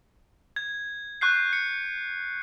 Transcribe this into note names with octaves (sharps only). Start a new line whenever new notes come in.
G#6
C#6 F#6 G6 C7
C#7